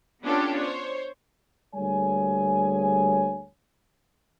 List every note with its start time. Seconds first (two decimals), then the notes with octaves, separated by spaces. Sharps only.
0.22 B3 C#4 D4 F4 G4 A4
0.56 C5 C#5
1.74 D2 G3 A#3 G#4 C#5 G#5